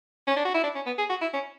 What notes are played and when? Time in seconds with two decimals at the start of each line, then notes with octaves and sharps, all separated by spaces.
0.28 C#4
0.36 D4
0.45 F#4
0.54 E4
0.63 D4
0.75 C#4
0.86 B3
0.98 G#4
1.10 F#4
1.21 E4
1.34 C#4